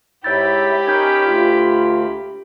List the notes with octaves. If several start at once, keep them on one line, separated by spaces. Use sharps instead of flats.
G#2 E4 G4 C#5 B5 G6 A6
C#4 D#4 A#4 G6 G#6
D2 F4